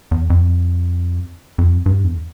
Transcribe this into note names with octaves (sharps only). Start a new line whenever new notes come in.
E2
F2
F2
G2
E2